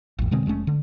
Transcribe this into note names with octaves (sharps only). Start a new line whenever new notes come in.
A1 F2
B2 D3 G#3 C4
F1 G#3 A3 C#4
D3